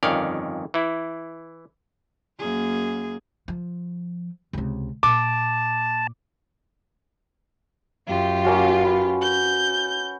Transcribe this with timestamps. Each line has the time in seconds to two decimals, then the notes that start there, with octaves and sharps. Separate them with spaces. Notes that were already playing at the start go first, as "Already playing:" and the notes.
0.03 G1 F2 D#3 C#4 D5 F5
0.74 E3 E4
2.39 F#2 A#3 G#4
3.48 F3
4.53 C#2 C3
5.03 A#2 A5 D6
8.06 F#2 F4 G4
8.45 A#3 C#4 F#4
8.84 B4
9.21 G6